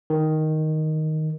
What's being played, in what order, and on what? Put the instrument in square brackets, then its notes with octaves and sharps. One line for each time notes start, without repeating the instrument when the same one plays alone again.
[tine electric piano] D#3